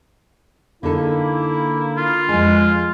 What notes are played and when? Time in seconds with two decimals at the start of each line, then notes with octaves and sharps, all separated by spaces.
0.83 D3 A#3 D#4 E4 A4
1.97 F4
2.29 F2 G#3 G#5